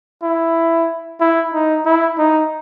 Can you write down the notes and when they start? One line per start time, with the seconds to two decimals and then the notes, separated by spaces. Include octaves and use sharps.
0.22 E4
1.20 E4
1.53 D#4
1.85 E4
2.18 D#4